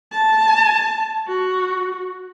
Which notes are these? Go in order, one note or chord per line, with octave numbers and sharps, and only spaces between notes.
A5
F#4